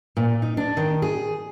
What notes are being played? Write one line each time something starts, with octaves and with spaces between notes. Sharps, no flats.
A#2
D#4
D4
D#3
G#4